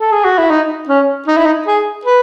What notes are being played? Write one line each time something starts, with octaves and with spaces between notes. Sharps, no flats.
A4
G#4
F#4
E4
D#4
C#4
D#4
E4
D#4
G#4
B4